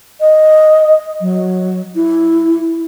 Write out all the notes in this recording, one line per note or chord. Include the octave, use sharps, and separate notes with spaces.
D#5
F#3
E4